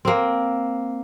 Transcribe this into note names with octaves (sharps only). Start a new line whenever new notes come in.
A#3 C4